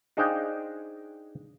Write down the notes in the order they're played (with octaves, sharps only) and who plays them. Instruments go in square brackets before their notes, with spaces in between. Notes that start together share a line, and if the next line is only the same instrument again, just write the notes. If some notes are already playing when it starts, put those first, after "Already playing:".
[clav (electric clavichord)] D4 D#4 G#4 C5 F5 G5